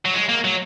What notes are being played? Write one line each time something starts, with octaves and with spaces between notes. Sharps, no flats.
F#3
G#3
A#3
F#3